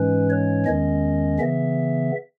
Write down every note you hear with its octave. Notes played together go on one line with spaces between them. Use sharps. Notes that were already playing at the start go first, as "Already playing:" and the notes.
Already playing: G#2 E3 G#3 C#4 B4
C#5
E2 D#3 G#3 C#4 D#5
C#3 E3 B3 E5